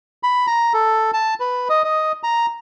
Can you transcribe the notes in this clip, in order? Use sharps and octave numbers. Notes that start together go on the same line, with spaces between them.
B5
A#5
A4
A5
B4
D#5
D#5
A#5